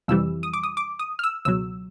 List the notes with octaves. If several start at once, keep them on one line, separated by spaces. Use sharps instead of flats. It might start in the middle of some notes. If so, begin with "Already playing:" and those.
F2 C3 E3 G3 E6
D#6
D6
D#6
D6
D#6
F6
E6
C#2 B2 F#3 E6